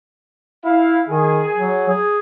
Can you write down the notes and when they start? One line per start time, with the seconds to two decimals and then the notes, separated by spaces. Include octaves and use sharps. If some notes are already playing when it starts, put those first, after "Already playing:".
0.65 E4 F5
1.09 D#3 G#4
1.55 F#3
1.89 G#4